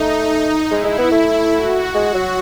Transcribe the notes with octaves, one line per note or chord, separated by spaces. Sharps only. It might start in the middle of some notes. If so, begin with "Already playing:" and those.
Already playing: A3 D#4
G#3 E4
G#3
B3
A3
F#4
G#3
F#3